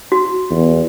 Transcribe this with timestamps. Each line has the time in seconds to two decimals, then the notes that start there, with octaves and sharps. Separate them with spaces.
0.12 F#4
0.51 E2